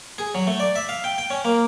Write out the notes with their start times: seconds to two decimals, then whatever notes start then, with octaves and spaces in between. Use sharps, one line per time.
0.18 G#4
0.35 F#3
0.47 A3
0.60 D5
0.76 E5
0.89 F5
1.04 G5
1.18 G5
1.30 C#4
1.45 A#3